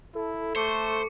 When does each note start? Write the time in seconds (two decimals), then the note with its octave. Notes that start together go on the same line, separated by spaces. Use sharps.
0.15 E4 A4
0.56 A3 C5 C#6 D6 C#7